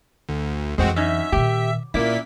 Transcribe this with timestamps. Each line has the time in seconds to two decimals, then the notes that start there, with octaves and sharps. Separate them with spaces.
0.29 D2
0.78 F2 E3 G#3 C4 F#4
0.96 F#2 C#4 D#4 E5
1.32 A#2 D#3 G4
1.94 A#2 A#3 C#4 E4 D5 B6